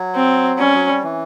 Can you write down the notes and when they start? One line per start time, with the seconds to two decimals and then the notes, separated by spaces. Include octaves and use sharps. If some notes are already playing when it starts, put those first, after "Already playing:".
Already playing: F#3
0.15 C4
0.59 G3 C#4
0.74 F#3
0.88 G3
1.03 E3